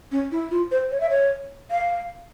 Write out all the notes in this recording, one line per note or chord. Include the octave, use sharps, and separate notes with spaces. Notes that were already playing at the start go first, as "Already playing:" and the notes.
C#4
E4
F4
C5
C#5
E5
C#5
F5